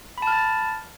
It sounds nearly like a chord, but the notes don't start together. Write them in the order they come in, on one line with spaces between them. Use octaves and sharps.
B5 A5 F6 A6